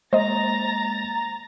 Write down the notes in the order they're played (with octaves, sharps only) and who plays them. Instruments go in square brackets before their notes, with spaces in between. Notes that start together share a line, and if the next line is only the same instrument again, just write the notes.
[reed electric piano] G#3 A#3 [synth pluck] C5 D#5 [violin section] A#5 A6 A#6